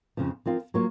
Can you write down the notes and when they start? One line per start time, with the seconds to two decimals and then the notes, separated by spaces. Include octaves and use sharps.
0.17 F2 C#3 F3
0.46 F3 C4 F4 A#4
0.74 F#3 A#3 F4 A#4 C#5